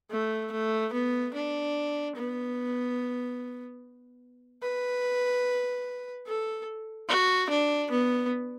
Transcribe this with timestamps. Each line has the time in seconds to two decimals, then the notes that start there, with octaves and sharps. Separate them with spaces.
0.11 A3
0.52 A3
0.93 B3
1.34 D4
2.16 B3
4.62 B4
6.27 A4
7.09 F#4
7.50 D4
7.91 B3